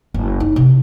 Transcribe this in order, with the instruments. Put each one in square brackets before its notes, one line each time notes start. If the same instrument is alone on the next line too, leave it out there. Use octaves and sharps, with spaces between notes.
[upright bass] F#1
D#4
C3